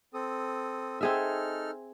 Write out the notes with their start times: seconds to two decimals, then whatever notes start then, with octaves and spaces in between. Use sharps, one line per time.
0.14 C4 A4 D#6
1.01 C4 D#4 G#4 A4 E5 F6